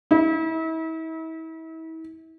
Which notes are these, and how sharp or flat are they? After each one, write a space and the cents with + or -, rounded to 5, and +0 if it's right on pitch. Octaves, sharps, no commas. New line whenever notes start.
E4 -35